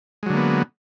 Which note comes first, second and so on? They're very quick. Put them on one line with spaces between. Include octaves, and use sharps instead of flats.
G#3 F#3 D3 A#3 B3